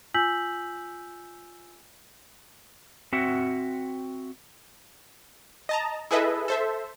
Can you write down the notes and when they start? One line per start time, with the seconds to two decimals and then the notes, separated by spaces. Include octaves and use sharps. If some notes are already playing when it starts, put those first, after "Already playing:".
0.14 F4 G#5 E6 G6 B6 F#7
3.13 C4 F#4 E5 F#5
5.69 D#5 A5 A#5
6.11 E4 G#4 A4 B4 D#5 E5
6.48 A4 C5 E5